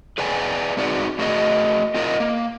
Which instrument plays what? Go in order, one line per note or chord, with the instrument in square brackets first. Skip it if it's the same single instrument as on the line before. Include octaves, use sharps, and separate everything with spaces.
[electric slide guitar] G#4 B4 D5 G5 G#5
G#3 C4 D#4 F#4 G#4 D5
A3 F#4 G#4 A#4 D#5
C4 F4 A#4 D#5
A#3